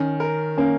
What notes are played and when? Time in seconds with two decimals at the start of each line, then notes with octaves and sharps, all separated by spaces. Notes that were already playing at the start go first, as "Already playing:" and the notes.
Already playing: D#3 C#4
0.20 A#4
0.58 A#3 C#4